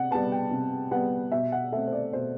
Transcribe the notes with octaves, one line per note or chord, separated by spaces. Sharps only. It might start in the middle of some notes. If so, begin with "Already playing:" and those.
Already playing: C3 F#5
G3 B3 A5
G5
C3
G3 B3 F#5
B2 E5
F#5
A3 C4 E5
C5
D5
B2 C5